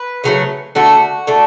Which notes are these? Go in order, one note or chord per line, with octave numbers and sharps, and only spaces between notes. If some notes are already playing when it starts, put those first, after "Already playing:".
Already playing: B4
C#3 F#3 A3
D3 A3 F#4
D3 A3